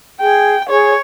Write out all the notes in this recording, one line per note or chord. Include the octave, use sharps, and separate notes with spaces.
G#4 G5
G#4 C#5